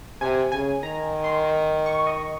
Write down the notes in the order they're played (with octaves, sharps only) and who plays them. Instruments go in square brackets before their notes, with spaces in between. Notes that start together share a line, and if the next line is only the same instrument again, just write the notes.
[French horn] C3 [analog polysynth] G#5
[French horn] C#3 [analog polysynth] G#5
[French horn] D#3 [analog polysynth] A#5
[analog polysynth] C6
C#6
D#5